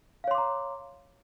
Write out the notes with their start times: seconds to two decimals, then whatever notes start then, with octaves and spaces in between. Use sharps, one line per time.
0.24 F5
0.28 C#5
0.31 C6
0.35 D6
0.38 A#5